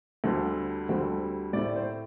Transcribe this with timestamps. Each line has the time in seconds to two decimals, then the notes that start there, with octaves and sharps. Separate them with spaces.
0.24 D2 D3 G3 C4 A4
0.89 D2 D3 G3 C4
1.53 A2 A3 C4 D5
1.76 C5